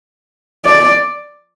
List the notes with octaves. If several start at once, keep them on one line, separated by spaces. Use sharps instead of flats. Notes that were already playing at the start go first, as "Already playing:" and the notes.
D5